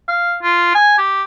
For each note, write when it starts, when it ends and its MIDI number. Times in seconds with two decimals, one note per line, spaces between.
0.08 0.38 77
0.43 0.72 65
0.75 0.95 80
0.98 1.23 67